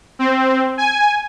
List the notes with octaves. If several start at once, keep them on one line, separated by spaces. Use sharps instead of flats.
C4
G#5